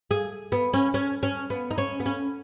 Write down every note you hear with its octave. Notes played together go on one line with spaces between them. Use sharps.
G#4
B3
C#4
C#4
C#4
B3
D#4
C#4
B3
C#4